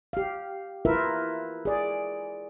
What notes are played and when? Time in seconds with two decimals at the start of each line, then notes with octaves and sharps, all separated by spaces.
0.13 G4 F5
0.85 E4 F4 A#4 B4 E5
1.65 G#4 D5